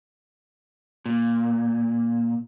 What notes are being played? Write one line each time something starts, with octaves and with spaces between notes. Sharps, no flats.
A#2